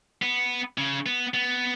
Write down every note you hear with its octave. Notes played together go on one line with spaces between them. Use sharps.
B3
C#3
B3
B3